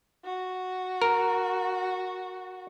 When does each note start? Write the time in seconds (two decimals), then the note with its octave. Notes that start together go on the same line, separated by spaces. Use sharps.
0.24 F#4
1.02 A#4